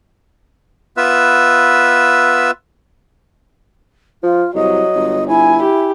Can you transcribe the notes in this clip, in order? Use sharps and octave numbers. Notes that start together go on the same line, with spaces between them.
B3 F4 B4 E5 E6
F3 F4
C2 F#3 D#5
G1
E4 G#5
G4